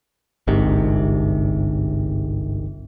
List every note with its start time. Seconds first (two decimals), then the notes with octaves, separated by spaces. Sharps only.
0.47 G1 C2 G#2 C3